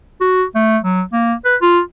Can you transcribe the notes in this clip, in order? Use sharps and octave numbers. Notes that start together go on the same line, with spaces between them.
F#4
A3
F#3
A#3
B4
F4